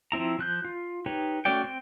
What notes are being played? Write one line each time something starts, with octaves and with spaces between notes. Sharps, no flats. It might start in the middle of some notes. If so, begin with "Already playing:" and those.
F3 C4 E4 A#5
F3 F#6 G6
F4
D#4 G4 B4 C#5
A3 C#4 F#4 D5 G5
C4 G5